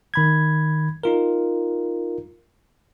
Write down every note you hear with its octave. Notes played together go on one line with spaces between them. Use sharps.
D#3 B5 G#6
D#4 F4 A#4